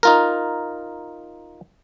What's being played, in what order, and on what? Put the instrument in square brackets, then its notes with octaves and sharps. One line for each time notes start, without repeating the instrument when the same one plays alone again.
[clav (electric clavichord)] D#4 F4 A#4